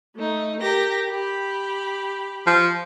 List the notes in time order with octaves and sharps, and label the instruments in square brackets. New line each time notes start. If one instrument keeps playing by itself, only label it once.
[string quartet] A3 D#4
G4 A#4 A#6
G4 B5
[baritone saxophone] F3